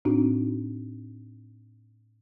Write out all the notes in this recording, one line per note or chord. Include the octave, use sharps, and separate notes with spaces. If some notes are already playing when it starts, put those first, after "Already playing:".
A2 C4 D4 D#4 F#4